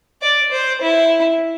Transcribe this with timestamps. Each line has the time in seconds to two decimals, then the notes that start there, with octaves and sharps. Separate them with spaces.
0.22 D5
0.52 C5
0.81 E4